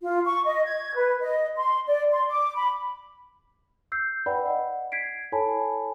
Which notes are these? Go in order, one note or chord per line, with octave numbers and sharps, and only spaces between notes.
F4
C#6
D#5
G#6
B4
D#5
C6
D5
C6
D6
B5
E6 G6 C7
B4 D5 F#5 G5 B5
D5 D#5 F#5
G#6 B6 C7 D7
E4 A4 C#5 G#5 A5 B5